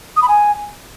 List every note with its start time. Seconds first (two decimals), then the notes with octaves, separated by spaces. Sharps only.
0.17 D#6
0.23 B5
0.29 G#5